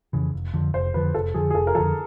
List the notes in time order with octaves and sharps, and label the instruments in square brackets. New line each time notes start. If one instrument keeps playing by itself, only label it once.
[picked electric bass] F2 C#3 E3
F1
F2 D3 F3
[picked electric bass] F1 [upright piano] C5
[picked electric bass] F2 D3 F3 [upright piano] B4
[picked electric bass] F1 [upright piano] A4
[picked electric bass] F2 D3 F3 [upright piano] G#4
[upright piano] G#4
[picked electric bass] F1 [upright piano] A4
[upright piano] A#4
[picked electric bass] F2 D3 F3 [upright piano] A4